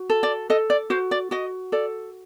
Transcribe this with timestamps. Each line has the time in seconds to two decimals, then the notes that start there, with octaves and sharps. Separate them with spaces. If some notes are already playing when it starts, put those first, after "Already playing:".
Already playing: F#4
0.10 A4
0.23 D5
0.50 A4 D#5
0.70 D5
0.90 F#4 C5
1.11 D5
1.31 F#4 D#5
1.72 A4 D5